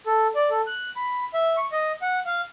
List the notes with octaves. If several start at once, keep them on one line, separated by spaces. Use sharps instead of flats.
A4
D5
A4
F#6
B5
E5
C#6
D#5
F#5
F5